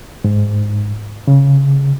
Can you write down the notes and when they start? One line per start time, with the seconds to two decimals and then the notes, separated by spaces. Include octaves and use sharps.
0.24 G#2
1.28 C#3